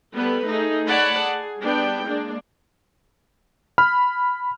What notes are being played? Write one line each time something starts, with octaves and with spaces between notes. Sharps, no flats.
G3 B3 A4 B4
A3 D#4 G#4
C#5 D5 F#5 A5 B5
G#4
G3 B3 D4 G5
G#3 A#3 D4
B5 F6